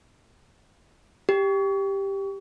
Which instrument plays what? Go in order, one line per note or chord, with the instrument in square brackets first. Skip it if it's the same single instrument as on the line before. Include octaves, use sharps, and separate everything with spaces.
[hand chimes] G4